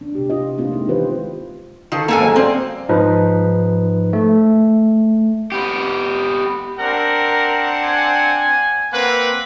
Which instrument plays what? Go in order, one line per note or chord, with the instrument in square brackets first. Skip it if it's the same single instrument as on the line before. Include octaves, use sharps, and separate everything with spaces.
[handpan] D4
C3 G4
C3 E4 F4 D#5
G#3 A#3 C4 D4 E4 F4
G#3 D#4
D#3 E3 F4 G4 B4 C5
[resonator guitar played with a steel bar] D#3 [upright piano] F4 A4
[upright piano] D#2 G#2 [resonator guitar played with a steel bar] A#3 A4 G#5
[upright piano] F#3 G#3 C5
[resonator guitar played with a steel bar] C4 [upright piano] C5 D5 F5
[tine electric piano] G#2 F3 D#4 B4
A3
[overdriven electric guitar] B3 G4
[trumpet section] C4 D4 F#5 [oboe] A#4
[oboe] G#5
[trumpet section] A#3 C4 B4 [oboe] F#5